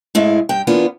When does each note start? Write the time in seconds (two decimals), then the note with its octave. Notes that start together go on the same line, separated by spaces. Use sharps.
0.15 A2 G#3 E4 F5
0.49 G2 G5
0.67 E3 A#3 B3 D4 F4